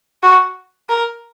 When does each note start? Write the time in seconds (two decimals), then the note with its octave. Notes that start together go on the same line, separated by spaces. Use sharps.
0.23 F#4
0.89 A#4